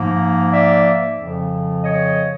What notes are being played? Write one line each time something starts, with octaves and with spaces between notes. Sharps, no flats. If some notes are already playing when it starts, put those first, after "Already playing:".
Already playing: G#2 F3 A#3
D5 E5
F2 C#3 F3
C#5 D#5